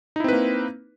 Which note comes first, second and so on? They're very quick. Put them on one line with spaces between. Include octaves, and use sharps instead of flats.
D#4 E4 C4 B4 A#3